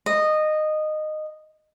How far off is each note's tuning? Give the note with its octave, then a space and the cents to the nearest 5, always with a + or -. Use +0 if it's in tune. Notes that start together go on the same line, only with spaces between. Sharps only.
D#5 -15